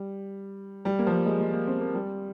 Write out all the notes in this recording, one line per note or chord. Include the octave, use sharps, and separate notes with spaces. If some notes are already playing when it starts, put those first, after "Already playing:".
Already playing: G3
G3
A#3
F3
G3
G#3
G#3
A#3
C4
A#3
G3